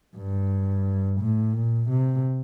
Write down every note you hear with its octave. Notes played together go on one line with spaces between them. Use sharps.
G2
A2
A#2
C3